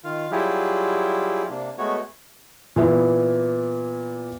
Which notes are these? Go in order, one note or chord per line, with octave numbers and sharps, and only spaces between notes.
D#3 F4 F5
F#3 G3 E4 F4 G4 G#4
C3 A#3 D4
G#3 A3 B3 F#4 C#5
A#2 E3 B3 E4